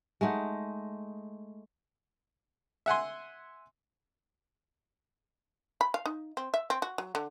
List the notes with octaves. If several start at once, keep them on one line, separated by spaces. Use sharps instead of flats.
G#3 A3 D#4 F#5
E5 F#5 G#5 C6
B5
F5
D#4
C4
E5
C4
F#4
F#3
D3